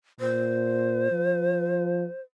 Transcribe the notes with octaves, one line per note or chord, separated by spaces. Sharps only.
A#2 C5
F3